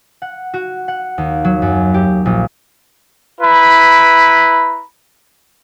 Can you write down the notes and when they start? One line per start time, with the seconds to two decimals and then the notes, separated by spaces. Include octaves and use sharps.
0.22 F#5
0.54 F#4
0.88 F#5
1.18 D#2
1.45 F#3
1.62 F#2
1.94 G4
2.26 A#1
3.41 E4 B4 A#5 B5